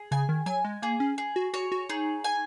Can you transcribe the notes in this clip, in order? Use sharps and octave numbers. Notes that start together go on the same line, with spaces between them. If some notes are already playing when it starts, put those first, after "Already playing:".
Already playing: G#4
C#3 G#5
D#3
F#3 G#5
G#3
A#3 G#4
C#4
G#4
F#4
F#4 C#5
F#4
D#4 G#4
G#5